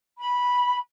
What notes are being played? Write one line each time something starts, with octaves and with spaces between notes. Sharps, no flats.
B5